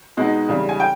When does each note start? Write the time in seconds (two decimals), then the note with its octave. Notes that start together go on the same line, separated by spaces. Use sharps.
0.17 B2 G#3 B3 D#4
0.49 E2 C#3 G3
0.69 G#5
0.80 G5